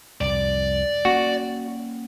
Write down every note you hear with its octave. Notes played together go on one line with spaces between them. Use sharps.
C2 F2 D5
A#3 C#4 F#4